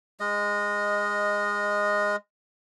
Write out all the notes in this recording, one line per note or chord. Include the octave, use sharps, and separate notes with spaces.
G#3 D#5